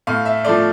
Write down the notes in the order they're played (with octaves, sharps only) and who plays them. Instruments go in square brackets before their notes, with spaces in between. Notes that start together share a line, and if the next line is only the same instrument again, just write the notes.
[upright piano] A2 F5
E5
F3 A3 D5